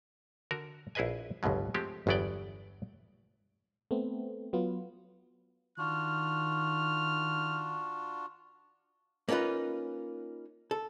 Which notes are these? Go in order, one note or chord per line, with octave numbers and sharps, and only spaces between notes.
D3 F#4 A#4
A#1 E4 G#4 B4 D#5 G#5
G1 C#2 G#2 B2 F#3
F3 G#3 A3 C4 G4
G1 E2 F#3 B3 D5 G5
A3 B3 C4
F#3 B3 F4
D#3 D4 F4 F#4 F6
A#3 C#4 D#4 F4 B4
A4